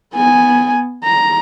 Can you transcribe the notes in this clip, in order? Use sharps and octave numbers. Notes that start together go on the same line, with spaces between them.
B3 G#5
A#5